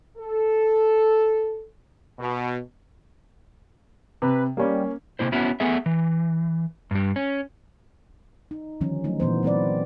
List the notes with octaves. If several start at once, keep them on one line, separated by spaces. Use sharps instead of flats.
A4
B2
C3 B4
G3 A#3 C#4
C3 D#3 A#3 E4 C5
B3 C#4 E4 F#4
A3 B3 G#4 E5
E3
G2 G3
C#4
D#4
D3 D#3 F3 G3 C#4
F#3 A3 D#4
A#2 E3 B3 C5
F#3 C4 B4 D5